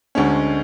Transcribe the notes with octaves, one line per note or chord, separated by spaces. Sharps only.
D2 D3 G#3 C#4